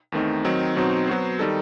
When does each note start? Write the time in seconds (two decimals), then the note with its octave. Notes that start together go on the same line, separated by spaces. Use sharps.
0.12 E2 D#3 A3 C4 D#4
0.45 D#3 F#3 C4 D#4
0.76 B2 F#3 C4 D#4 F#4
1.07 F#3 B3 F#4 C5
1.39 D#3 G3 D#4 A4